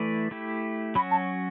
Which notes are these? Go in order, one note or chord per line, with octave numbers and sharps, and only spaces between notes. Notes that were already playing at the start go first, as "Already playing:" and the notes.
Already playing: E3 A3 E4 B4 D5
A3 E4 G4
F#3 C#4 F#4 B5
A5